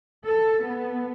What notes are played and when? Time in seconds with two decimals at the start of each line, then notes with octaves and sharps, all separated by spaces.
0.24 A4
0.62 B3